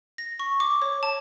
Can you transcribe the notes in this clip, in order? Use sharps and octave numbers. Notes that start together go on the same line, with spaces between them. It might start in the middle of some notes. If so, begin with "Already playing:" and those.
A#6
C#6
D6
C#5
A5